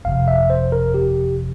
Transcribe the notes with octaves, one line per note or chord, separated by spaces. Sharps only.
G1 F2 C3 F3 F5
E5
C5
A#4
G4